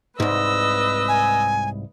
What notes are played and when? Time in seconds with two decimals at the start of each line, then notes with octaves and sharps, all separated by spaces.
0.20 C2 G#2 B4 D#5 E6
1.08 G#5